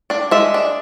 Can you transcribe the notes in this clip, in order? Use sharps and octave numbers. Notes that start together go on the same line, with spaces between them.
D4 D5
G#3 E5
D4